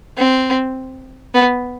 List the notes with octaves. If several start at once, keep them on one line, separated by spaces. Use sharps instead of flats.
C4
B3